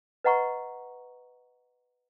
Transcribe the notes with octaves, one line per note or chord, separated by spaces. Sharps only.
B4 D#5 F#5 A#5 C#6